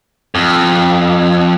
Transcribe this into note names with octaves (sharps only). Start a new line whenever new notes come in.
F2